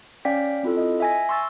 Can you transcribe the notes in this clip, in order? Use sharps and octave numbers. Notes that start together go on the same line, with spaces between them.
C#4 D5 F5 G5 B6
C4 E4 F4 A4
D#5
E5 G#5 A#6
C6 C#6 E6 A6